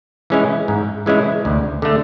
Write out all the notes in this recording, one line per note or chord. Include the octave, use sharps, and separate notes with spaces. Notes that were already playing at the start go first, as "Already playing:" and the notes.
E3 G#3 C#4 E4
G#2
E3 G#3 C#4 E4
D2
D3 A3